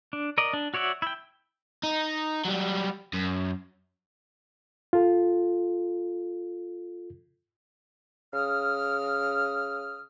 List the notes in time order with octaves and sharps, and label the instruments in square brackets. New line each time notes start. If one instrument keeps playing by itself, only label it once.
[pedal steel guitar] D4
A#4 D5 D#5
D4
F#4 C#5 D5 E5 F#5
E4 G5
[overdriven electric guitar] D#4
F#3 G3
F#2
[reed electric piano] F4 A4
[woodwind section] C#3 D#6 F6